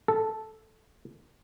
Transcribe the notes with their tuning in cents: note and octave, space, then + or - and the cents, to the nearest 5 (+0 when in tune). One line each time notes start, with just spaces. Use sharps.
A4 -5